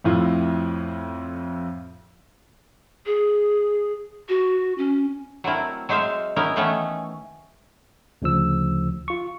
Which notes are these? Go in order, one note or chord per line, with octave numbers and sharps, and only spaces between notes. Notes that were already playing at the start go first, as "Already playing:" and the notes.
F2 A2 E4 F4
G#4
F#4
C#4
F#3 A3 C4 E4 A#4
F#3 G#3 C5 E5 F5
B3 C#4 D#4 E4 A#4
D#3 E3 A3 B3 C#4
D2 C#3 F3 E6
F4 C#6